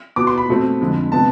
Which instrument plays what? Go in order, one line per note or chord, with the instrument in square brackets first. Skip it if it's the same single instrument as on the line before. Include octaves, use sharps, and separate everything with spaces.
[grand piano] B2 B3 D6
C6
B5
B2 A3 C4
F2 D3 G#3
C3 G#3 B3 A5